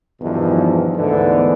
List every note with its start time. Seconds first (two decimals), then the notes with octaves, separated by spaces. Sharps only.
0.21 E2 G2 B2 D#3 F3
0.97 D2 G#2 D3 E3 B3